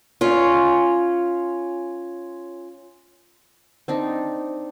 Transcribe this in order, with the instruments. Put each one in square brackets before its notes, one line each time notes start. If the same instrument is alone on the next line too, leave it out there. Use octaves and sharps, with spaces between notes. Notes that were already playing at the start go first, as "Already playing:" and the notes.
[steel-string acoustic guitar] C#4 F4
[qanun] C4 D4 D#4